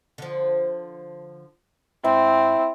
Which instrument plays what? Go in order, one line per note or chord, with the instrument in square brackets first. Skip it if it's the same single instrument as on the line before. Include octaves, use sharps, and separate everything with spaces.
[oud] D3 F3
[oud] G#2 [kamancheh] C4 [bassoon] E4